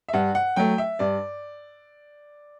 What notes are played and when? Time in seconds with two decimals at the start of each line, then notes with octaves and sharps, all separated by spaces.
0.08 E5
0.13 G2 F#5
0.35 F#5
0.56 F#3 A3 G5
0.78 E5
0.99 G2 D5